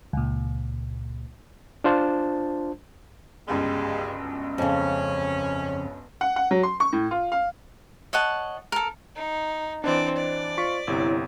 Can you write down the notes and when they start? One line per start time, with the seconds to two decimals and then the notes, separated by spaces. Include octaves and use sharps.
0.13 C#2 A#2
1.84 D4 F4 C5 A5
3.48 G1 C#2 F#2 G3 G#3
4.58 F2 C#3 C#4
6.21 F#5
6.36 F#5
6.51 F#3
6.63 C6
6.80 C#6
6.93 A2
7.11 F4
7.32 F5
8.13 C#5 D#5 F#5 A5
8.72 A4 A#4
9.15 D#4
9.84 E3 C4 D4 C5 D5 D#5
10.17 D5
10.58 F4 C#6 B6
10.87 G1 C3 E4 C#5